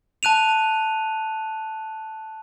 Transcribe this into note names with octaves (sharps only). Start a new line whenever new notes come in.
A5 F#6 D#7 F7